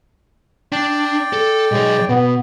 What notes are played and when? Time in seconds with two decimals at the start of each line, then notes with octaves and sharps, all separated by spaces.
0.72 D4 D5 G5
1.33 A4
1.71 B1 G#3 C#5
2.09 B2 B3